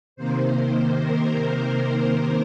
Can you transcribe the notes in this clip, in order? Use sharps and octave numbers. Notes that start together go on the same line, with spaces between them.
C3 D#3 A#3 C5
A#4